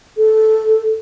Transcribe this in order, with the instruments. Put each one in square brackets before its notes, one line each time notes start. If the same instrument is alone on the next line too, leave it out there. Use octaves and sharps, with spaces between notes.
[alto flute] A4